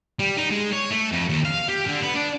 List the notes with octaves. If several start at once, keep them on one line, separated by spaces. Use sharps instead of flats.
G3
D#4
G#3
C#5
A3
F2
D#2
F5
G4
D3
B3
D4